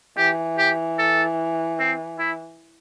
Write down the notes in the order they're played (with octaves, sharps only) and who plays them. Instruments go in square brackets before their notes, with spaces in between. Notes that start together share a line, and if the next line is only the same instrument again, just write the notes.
[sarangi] E3 [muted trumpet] G4
[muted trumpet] G4
A4
C4
E4